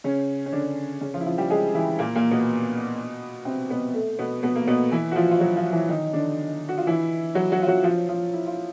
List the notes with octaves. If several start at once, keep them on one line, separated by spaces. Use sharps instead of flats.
C#3 C#4
C#4
D3 D4
C#3 C#4
F3 F4
E4
F3 F4
G3 G4
G#3 G#4
E3 E4
A#2 A#3
A#2 A#3
B2 B3
C3 C4
B2 B3
A3
B2 B3
B2 B3
A#3
B2 B3
E3 E4
F#4
F3 F4
F4
F#3 F#4
F3 F4
E3 E4
D#3 D#4
D3 D4
F#4
F4
E3 E4
F#3 F#4
F#3 F#4
F4
F#3 F#4
F3 F4
F3 F4
E4
F4